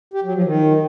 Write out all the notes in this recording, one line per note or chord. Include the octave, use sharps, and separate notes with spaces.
G4
F#3
F3
D#3